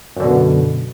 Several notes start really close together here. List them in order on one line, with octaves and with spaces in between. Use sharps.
F#2 D3 B2